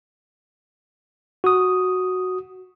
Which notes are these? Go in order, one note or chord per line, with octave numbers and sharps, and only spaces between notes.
F#4 D#6